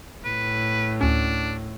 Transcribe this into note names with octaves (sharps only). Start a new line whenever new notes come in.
A2 B4
D2 C#4 D4